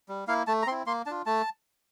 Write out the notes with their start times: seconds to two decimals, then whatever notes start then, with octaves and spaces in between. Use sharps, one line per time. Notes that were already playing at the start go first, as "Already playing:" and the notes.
0.09 G3
0.27 A#3 E4 F5
0.47 A3 A5
0.62 A#5
0.67 C4 C6
0.71 E4
0.86 A#3 C6
1.06 D4 F4 A5
1.26 A3 A5